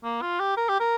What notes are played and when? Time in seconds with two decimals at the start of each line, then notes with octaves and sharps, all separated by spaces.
0.04 A#3
0.22 F4
0.40 G4
0.57 A#4
0.69 G4
0.80 A#4